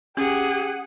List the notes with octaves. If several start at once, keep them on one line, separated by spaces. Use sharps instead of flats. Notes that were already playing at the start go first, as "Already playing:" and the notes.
C#4 G4 G#4 F#5